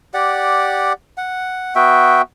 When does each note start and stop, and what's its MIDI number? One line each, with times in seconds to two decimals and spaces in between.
0.14 0.93 67
0.14 0.93 74
0.14 0.93 78
1.18 1.74 78
1.76 2.22 59
1.76 2.22 66
1.76 2.22 76
1.76 2.22 79